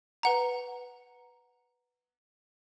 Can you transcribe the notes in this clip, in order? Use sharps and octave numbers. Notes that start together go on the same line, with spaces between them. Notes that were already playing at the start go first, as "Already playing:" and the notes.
B4 F#5 A#5